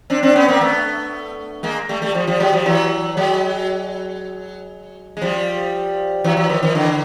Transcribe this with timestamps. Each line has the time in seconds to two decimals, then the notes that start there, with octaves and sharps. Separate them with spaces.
0.10 C4 D4
0.23 C4 D4
0.36 B3 C#4
0.48 A#3 C4
0.61 A3 B3
1.63 G#3 A#3
1.89 G3 A3
2.02 G3 A3
2.14 F3 G3
2.27 F3 G3
2.40 F#3 G#3
2.53 F3 G3
2.66 E3 F#3
3.17 F#3 G#3
5.17 G#3
5.22 F3 G3
6.24 E3 F#3
6.36 E3 F#3
6.49 D#3 F3
6.63 D#3 F3
6.75 D3 E3